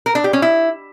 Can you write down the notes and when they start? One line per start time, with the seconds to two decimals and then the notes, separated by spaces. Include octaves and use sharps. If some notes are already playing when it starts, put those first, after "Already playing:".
0.06 A#4
0.15 D4
0.24 G4
0.33 C#4
0.42 E4